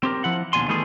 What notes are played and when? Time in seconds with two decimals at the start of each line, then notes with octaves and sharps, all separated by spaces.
0.03 C4 G4 A#4
0.24 F3 E4 F#5
0.53 D#2 B2 D4 G#5 C6
0.68 D#3 E3 G3 A3 B3 G#4